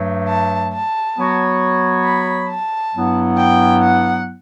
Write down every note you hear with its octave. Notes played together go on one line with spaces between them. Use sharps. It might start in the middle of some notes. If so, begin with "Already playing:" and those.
Already playing: G2 F#3 A3
A5
A5
F#3 B3 F#4 C#5
B5
A5
G2 F#3 B3 E4
G5
F#5